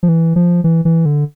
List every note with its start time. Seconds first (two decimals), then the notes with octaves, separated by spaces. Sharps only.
0.03 F3
0.09 E3
0.36 F3
0.64 E3
0.85 E3
1.06 D3